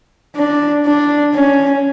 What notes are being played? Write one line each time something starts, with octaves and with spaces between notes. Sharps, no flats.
D4
D4
C#4